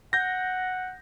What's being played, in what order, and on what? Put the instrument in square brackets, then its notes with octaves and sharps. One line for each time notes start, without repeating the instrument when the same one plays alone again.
[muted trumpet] F#5 [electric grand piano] G6 A#6